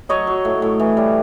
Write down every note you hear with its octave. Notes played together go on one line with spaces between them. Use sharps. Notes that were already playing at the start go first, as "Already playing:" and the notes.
F#3 C#5 D#5
F#3
A2
A2
E3
G3